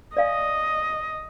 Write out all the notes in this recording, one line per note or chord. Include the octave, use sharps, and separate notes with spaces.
D5 D#5 F5 G#5